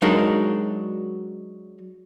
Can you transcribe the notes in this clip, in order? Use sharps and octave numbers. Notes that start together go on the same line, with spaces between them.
F#3 G#3 D4 D#4 A#4